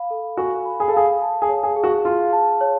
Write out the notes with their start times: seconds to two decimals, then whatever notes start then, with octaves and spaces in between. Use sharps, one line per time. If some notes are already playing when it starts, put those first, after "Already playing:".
Already playing: F5 B5
0.10 A4
0.37 F#4 G#5
0.66 B5
0.80 G#4
0.88 A4
0.94 G#4 F5
1.22 A5
1.42 G#4
1.49 C#5
1.63 G#4
1.76 G#4
1.84 F#4
2.05 F4 F5
2.33 A5
2.61 C#5